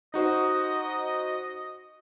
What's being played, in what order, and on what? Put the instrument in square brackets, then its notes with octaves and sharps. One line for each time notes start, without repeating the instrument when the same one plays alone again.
[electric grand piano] D#4 F#4 C5 [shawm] D#5